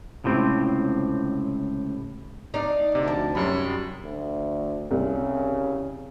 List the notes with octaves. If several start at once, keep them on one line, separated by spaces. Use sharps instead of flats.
C#2 A2 C3 C4
D4 D#4 D5 F5
D2 C3
F3 A5
F#2 C3 F#3 G3 B5
D2
C2 C#3